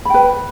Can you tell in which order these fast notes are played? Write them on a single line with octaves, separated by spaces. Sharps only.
B5 G5 B4